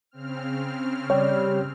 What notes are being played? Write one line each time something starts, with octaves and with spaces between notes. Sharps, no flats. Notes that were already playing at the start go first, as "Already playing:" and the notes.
C#3 C4 F6
G3 C#5